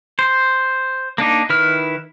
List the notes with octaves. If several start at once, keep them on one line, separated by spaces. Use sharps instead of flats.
C5
A#3 D4 D#4
D#3 E4 B4 F6